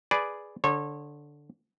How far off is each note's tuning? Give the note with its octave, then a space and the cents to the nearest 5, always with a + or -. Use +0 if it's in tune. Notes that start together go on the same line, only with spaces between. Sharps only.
G#4 +0 B4 +0 D5 -5
D3 +0 C#5 -30